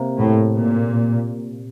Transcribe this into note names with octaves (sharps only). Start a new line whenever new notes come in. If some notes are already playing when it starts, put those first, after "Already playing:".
Already playing: C3 A#3
A2
A#2